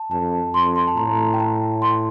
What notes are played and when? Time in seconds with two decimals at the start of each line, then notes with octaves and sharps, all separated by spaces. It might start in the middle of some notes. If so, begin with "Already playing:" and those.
Already playing: A5
0.11 F2 A5
0.54 F2 C6
0.76 C6
0.87 A5
0.96 A2 A#5
1.18 A5
1.34 G5
1.40 A5
1.82 C6